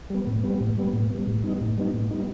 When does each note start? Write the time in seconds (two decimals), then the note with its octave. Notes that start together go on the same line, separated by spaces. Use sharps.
0.10 G3 B3
0.27 A2
0.44 G3 B3
0.60 A2
0.78 G3 B3
0.94 A2
1.10 G3 B3
1.27 A2
1.44 G3 B3 D#4
1.61 A2
1.78 G3 B3 D#4
1.94 A2
2.11 G3 B3 D#4